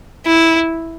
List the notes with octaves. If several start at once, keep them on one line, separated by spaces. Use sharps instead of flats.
E4